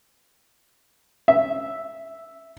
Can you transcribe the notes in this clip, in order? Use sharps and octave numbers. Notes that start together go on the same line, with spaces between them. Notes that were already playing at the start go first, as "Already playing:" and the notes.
E5